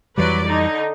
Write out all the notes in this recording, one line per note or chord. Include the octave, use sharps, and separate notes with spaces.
F2 E3 F#3 G3 B4 D5
D3 D#4